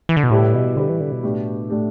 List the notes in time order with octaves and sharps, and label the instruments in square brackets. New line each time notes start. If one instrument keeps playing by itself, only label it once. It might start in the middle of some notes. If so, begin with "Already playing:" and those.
[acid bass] E3
D3
B2
[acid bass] A2 [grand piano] G3 E4 G4 B4
[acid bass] B2
[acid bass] D3 [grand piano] G3 E4 G4 B4
[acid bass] E3
D3
B2
[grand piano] A2 A3 D4 G4
A2 A3 D4 G4